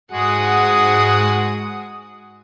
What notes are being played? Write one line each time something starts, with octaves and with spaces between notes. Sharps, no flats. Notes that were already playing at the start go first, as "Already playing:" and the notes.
G#2 G#3 F#4 G#4 F#5 D#6